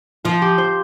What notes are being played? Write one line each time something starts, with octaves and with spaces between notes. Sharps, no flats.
F3 F4
G4
C5